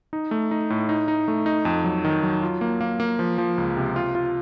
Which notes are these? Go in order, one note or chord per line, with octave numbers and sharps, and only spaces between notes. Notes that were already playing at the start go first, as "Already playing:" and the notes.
D#4
A3
D#4
A2
D#4
D#4
A3
D#4
F2
F#3
D#3
F#3
F4
A#3
A#3
A#3
F3
F3
C#2
C3
F4
F4